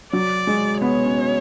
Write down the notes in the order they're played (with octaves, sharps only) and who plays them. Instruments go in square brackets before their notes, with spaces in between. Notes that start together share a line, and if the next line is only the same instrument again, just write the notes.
[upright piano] F#3 [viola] D5
[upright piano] G#3
[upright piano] B3 [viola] C#5
[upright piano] C#4